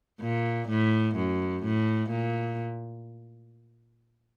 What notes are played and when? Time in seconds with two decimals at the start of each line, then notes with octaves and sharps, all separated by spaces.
0.21 A#2
0.69 A2
1.16 F#2
1.64 A2
2.10 A#2